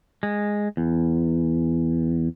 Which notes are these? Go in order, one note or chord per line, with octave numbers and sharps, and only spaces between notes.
G#3
E2